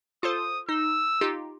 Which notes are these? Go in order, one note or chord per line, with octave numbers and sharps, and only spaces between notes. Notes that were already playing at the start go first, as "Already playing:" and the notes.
F4 A4 C5 D#6
D#4 E6
D#4 F4 G4